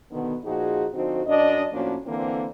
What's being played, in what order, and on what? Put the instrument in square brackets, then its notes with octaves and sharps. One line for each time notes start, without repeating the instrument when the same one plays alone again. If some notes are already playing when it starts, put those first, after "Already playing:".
[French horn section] B2 D3 D#3 B3
A#2 F3 D#4 F#4 G#4
D3 F3 C4 D#4 F#4
F#2 D4 D#5
A2 F3 A#3 C#4 D4 F#4
D3 E3 A#3 C4